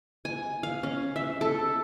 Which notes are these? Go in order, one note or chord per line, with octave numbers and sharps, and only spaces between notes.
G#5
F5
C#4
E5
A4